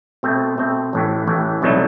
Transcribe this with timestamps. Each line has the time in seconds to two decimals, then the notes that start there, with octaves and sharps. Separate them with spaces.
0.23 B2 A3 C4
0.58 B2 A3 C4
0.93 A1 A2 E3
1.27 A1 A2 E3
1.62 C2 B2 F#3 A3 D#4